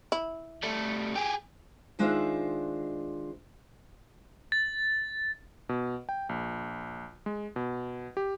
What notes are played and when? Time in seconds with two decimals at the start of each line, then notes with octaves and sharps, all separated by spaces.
0.12 E4
0.63 G3 A3
1.16 G4 G#4
1.99 D#3 G#3 D4 F4 C5 E5
4.52 A6
5.69 B2
6.09 G5
6.29 A#1
7.26 G#3
7.56 B2
8.17 G4